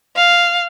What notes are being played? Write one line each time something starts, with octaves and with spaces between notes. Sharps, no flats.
F5